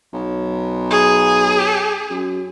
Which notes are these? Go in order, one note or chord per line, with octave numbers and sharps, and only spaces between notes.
B1
G#4
F#2